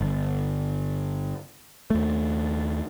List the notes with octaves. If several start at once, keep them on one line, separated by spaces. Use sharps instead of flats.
G1
D#2 A3